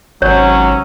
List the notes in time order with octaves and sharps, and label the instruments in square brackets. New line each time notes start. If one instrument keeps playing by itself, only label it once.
[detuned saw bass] G#1 [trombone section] C3 C#4 [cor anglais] F#3 [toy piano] C#5